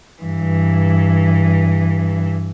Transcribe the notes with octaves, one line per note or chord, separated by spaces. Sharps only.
G2 E3